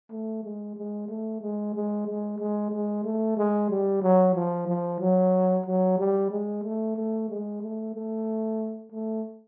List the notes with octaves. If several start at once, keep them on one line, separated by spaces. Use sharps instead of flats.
A3
G#3
G#3
A3
G#3
G#3
G#3
G#3
G#3
A3
G#3
G3
F#3
F3
F3
F#3
F#3
G3
G#3
A3
A3
G#3
A3
A3
A3